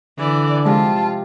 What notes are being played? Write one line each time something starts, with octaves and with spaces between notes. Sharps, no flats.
D3 E3 D5
C3 F3 G#3 F4 A5